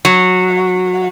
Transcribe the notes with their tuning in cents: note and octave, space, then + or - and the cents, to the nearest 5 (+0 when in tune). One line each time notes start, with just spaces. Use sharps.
F#3 -15